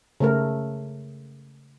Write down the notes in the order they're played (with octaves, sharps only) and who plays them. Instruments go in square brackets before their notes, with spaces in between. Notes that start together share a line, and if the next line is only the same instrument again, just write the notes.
[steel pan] C#3 A3 A#4